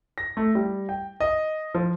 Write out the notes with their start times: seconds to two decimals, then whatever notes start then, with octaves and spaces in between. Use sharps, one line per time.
0.18 A#6
0.37 A3
0.55 G3
0.89 G5
1.20 D#5
1.75 F3